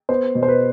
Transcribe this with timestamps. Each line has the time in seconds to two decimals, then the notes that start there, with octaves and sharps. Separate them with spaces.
0.09 B3 C5
0.35 B2
0.43 C5
0.48 B4